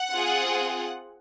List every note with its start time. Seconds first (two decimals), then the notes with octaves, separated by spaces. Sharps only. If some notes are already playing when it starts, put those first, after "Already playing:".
Already playing: F#5
0.11 C4 F4 G#4